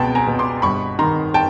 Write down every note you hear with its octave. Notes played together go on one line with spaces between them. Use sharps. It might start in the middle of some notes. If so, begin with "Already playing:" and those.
Already playing: C#2 B2 G5 A5
G#5 A#5
B2
C6 D6
G1 B5 C#6
D#3 A#5 C6
G5 A5